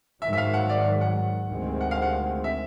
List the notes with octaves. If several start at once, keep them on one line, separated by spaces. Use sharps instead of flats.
G#2 D#3 F#3 E5
E5
F5
F#5
D5
F#5
D2 C3 D#3 G#3 C4
F#5
F5
F#5
E5